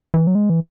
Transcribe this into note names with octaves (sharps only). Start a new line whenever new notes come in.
E3
F#3
G#3
E3